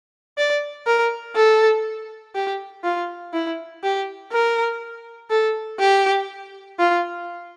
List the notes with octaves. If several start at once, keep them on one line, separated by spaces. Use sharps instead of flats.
D5
A#4
A4
G4
F4
E4
G4
A#4
A4
G4
F4